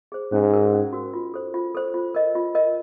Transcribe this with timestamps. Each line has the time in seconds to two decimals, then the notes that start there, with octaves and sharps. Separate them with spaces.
0.12 G#4 C5
0.32 G#2 C#4
0.52 F#4 A#4
0.73 C#4
0.93 F#4 A#4
1.14 F4
1.34 A4 C5
1.54 F4
1.75 A4 C5
1.94 F4
2.15 A#4 D#5
2.35 F4
2.55 A#4 D#5